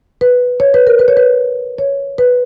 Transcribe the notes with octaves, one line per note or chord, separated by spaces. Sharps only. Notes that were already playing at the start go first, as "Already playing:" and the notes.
B4
C#5
B4
A#4
B4
C#5
B4
C#5
B4